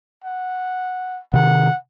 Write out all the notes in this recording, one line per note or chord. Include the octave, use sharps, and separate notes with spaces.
F#5
C3 D#3 F#5